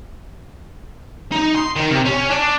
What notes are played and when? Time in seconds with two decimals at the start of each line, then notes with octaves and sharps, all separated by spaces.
1.32 D#4
1.56 C6
1.76 D#3
1.91 C3
2.05 C#4
2.30 D4